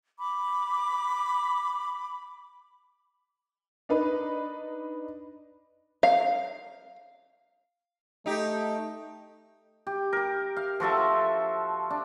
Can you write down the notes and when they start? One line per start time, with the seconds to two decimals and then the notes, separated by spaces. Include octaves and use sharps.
0.19 B5 D6
3.89 D4 D#4 B4
6.03 F5
8.26 A3 D#4 G4
9.87 G4
10.13 G4 A#4
10.56 F5
10.80 F3 F#4 A4 E5
11.90 D4